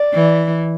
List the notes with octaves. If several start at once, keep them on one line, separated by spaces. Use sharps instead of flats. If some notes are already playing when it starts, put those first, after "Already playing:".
Already playing: D5
E3